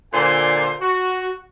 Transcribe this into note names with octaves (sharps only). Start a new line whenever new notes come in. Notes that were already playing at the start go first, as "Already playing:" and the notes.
A#2 D3 C5 G#5 C6
F#4